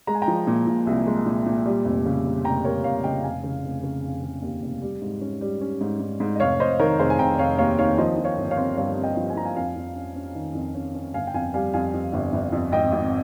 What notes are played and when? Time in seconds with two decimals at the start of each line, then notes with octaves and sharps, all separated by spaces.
0.07 G#3 A#5
0.15 G#5
0.22 G5 A#5
0.28 F3
0.47 A#2
0.67 A#2
0.87 C2
1.07 G#3
1.26 A#2
1.46 A#2
1.66 G3
1.85 F1
2.06 C#3
2.25 G3
2.45 F1 G5 A#5
2.64 G3 A#4 C#5
2.84 F1 C#5 F5
3.04 C#3 D#5 G5
3.24 F1 F5 G#5
3.43 C#3
3.64 F1
3.83 C#3
4.03 F1
4.23 C#3
4.42 D#2
4.62 F1
4.82 G3
5.02 G#2
5.21 C#4
5.41 G3
5.61 C#4
5.81 G#2
6.00 G#2
6.20 G#2
6.36 D#5
6.40 F1 C#5 F5
6.60 F1 C5 D#5
6.79 D#3 A#4 C#5
6.99 F1 G#4 C5
7.10 G#5
7.19 F1 G5 A#5
7.39 F1 C#5 F5
7.58 D#2 C#5 F5
7.78 D#3 C#5 F5
7.98 F3 C5 D#5
8.18 F3
8.24 C#5 F5
8.38 G1
8.51 C#5 F5
8.57 C4
8.77 G2 C#5 F5
8.97 C4
9.03 D#5 G5
9.17 F3
9.30 G#5
9.36 F3 A#5
9.45 F5 G#5
9.56 F2 F5 G#5
9.76 F2
9.96 C#4
10.16 C#4
10.35 D#3
10.55 F2
10.75 C#4
10.94 C#4
11.14 G1 F5 G#5
11.27 G5
11.34 F2 F5 G#5
11.54 G3 F5 G#5
11.73 F2 F5 G#5
11.94 F2
12.13 G1
12.33 G1
12.52 F2
12.72 G#1 D#5 G5
12.92 G#1